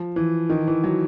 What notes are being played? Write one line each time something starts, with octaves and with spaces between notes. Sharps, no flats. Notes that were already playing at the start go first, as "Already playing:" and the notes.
Already playing: F3
E3
D#3
E3
F#3